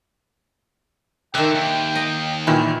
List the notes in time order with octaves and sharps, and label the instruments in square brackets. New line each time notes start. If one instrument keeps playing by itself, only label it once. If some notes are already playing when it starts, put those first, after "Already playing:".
[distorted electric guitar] D3 [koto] D#3 E5 [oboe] G5 [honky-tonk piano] F#6
[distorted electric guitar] D#2
[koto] D#5
[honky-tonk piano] A#2 D#3 E3 [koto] E4